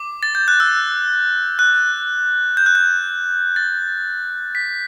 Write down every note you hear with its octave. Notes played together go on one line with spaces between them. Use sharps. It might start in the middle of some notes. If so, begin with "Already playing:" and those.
Already playing: D6
A6
G6
F#6
E6
F#6
G6
F#6
G6
A6
B6